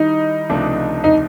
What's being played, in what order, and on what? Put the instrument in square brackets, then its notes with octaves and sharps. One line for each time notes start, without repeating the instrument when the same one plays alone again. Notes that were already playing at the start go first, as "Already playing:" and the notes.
Already playing: [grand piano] D#3 G3 E4 [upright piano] D#4
[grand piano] C#2 C3 F3 A3 D4
[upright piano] D#4